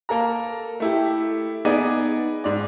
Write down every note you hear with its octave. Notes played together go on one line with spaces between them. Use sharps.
A#3 A4 A#5
A3 E4 G4
B3 D#4 G#4 D5
G#2 D5